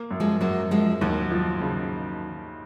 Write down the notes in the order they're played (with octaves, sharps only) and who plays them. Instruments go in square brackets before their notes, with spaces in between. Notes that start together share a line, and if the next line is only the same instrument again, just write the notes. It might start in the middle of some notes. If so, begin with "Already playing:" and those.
Already playing: [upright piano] A#3
F#2
[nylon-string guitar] F3 G#3
[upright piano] F#2 [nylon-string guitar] F#3 A#3
[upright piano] F#2 [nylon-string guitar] F3 G#3
[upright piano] D#2 [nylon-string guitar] D#3 F#3
[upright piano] F3
C#3